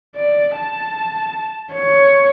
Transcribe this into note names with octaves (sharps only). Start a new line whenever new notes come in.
D5
A5
C#5